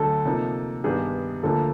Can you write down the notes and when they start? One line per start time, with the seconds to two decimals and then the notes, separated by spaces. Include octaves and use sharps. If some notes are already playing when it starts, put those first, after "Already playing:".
Already playing: D2 D3 F#3 A3 A4
0.25 C3 F3 A#3 D#4
0.84 G2 D#3 G3 B3 D4 G#4
1.43 D2 D3 F3 A#3 A4